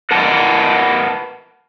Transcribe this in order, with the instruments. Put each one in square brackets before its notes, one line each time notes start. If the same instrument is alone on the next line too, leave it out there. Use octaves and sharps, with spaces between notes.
[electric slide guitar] A#4 B4 F#5 A5